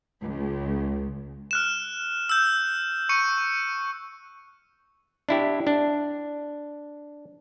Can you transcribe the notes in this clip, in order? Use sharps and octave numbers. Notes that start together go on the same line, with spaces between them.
C#2
F6 F#6 E7
E6 G6
C#6 C#7 D#7
D4 E4 G4
D4